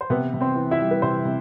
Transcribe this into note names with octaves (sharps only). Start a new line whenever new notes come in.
C5
C3 B3 B4
C3
C4 C5
E3
E4 E5
G3
B4
C3 C4 C5
C3